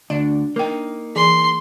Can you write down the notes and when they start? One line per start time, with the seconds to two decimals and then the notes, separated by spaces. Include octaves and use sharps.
0.10 D2 D4
0.56 A#3 D#4 A#4 G5
1.16 E3 G#4 C6